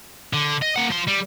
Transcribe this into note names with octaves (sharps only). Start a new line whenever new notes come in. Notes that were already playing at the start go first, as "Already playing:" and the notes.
D3
D#5
A#3 F#5
F3 C6
G3